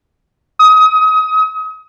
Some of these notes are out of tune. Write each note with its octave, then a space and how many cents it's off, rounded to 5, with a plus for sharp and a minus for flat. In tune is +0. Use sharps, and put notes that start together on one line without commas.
D#6 +25